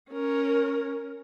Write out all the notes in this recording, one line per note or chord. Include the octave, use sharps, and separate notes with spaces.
C#4 A#4